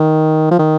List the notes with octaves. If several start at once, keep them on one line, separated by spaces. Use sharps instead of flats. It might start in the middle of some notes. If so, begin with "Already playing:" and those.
Already playing: D#3
F3
D#3